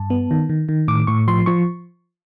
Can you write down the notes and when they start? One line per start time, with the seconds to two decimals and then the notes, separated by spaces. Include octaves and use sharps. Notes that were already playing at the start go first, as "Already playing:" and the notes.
Already playing: G2 A5
0.10 B3
0.31 D#3
0.49 D#3
0.69 D#3
0.88 A2 D6
1.07 A2 C#6
1.28 F3 C6
1.46 F3 C#6